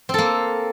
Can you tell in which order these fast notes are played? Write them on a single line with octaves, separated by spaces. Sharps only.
C4 A4 A#3